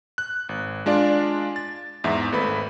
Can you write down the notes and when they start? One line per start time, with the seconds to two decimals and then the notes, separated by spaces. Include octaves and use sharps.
0.18 F#6
0.49 G#1
0.86 G#3 D4 F4 D5
1.56 A6
2.04 E2 G#2 E5
2.32 G#1 A3 B4 B5